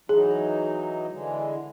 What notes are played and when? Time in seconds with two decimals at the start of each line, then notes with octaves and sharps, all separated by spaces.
0.09 E3 F#3 D#4 G#4
1.11 D3 E3 G#3